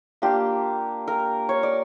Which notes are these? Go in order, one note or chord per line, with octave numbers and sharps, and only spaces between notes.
A#3 D4 F4 G4
A#4
C#5
D5